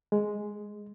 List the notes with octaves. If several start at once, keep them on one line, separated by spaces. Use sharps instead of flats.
G#3